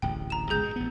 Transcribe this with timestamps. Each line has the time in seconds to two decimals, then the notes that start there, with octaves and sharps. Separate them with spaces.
0.02 D1 A1 G5
0.30 A#5 E7
0.50 G1 C#2 G#4 G6
0.63 B2
0.76 A1 B3